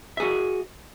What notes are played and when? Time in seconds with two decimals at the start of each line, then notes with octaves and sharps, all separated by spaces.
0.17 E5
0.20 G#4
0.22 F#4